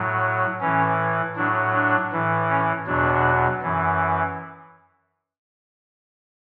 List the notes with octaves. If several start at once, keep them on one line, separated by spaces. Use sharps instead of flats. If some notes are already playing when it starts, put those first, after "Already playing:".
Already playing: A2 F#3
A2 E3 C#4
A2 F#3 D4
D4
A2 E3
C#4
E2 B2 F#3 D4
F#2 E3